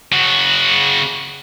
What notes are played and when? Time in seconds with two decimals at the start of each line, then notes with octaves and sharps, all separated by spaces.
0.12 C#3 F#4